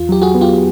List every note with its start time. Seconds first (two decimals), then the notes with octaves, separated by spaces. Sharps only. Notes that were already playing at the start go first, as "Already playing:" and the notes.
Already playing: E2 F4
0.09 F#3 G4
0.22 F#4 G#4
0.35 B3
0.41 F4 G4